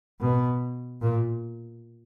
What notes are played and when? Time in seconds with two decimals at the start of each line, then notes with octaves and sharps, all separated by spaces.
0.21 B2
1.02 A#2